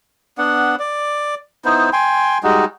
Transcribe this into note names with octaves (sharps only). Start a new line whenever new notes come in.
B3 D4 F#5
D5
B3 D#4 E4 C5
G5 G#5 C6
G3 G#3 D#4 F#4